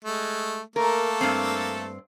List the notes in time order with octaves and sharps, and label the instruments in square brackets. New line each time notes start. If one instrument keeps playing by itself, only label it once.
[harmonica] G#3 A3
[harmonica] A3 A#3 A4 [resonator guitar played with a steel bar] A#4
[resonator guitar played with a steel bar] G2 C4